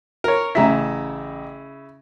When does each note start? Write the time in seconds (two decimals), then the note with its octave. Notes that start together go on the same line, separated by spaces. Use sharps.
0.24 A#4 C#5
0.55 A1 C#3 E4 A#5 B6